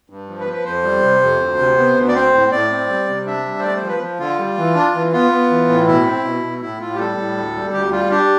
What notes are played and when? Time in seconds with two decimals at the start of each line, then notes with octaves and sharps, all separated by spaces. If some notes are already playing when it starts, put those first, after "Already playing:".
0.10 G2
0.29 F3
0.40 B4
0.47 F3
0.53 B4
0.65 F2 C5
0.84 G3
1.03 C3
1.22 F2
1.40 D2
1.59 C3
1.78 B3
1.96 D2
2.08 D5
2.15 C4 C5
2.34 A2
2.52 A2 D5
2.71 C4
2.89 G3
3.08 C3
3.26 D4 E5
3.45 G3
3.59 C5
3.63 A3 D5
3.77 C5
3.82 F3
3.88 B4
4.00 F3
4.20 D3 F4
4.39 G3
4.57 E3
4.75 D4
4.95 E3
5.12 B3 F4
5.31 B3
5.50 E3
5.69 A2
5.87 B2 E4
6.05 C4
6.24 B2
6.43 B2
6.62 A2 E4
6.81 A2 F4
6.94 G4
6.98 G3 A4
7.18 A2
7.37 D2
7.56 G3
7.73 D2 G4
7.92 G3 F4
8.11 D4 G4